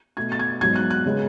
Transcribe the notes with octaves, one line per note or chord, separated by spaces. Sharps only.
B2 A3 G#6
A6
G#6
G#2 F#3 B3 G#6
F#6
F#6
C#3 G#3 B3